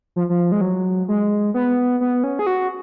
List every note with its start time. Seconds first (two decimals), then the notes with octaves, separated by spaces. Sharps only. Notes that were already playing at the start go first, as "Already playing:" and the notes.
0.16 F3
0.29 F3
0.52 G#3
0.61 F#3
1.08 G#3
1.54 B3
2.01 B3
2.24 C#4
2.39 G#4
2.47 F#4